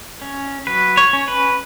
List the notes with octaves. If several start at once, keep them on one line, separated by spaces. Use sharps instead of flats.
C#4
F#3 B4
C#5
C#4
B4